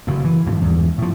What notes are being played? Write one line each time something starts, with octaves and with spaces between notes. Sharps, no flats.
F#1 A2
E3
G#1 G2 F3
E2 G#2
A2 F3